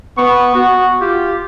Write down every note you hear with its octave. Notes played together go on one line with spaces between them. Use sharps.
B3 C#6
B3 F#4
F4 G4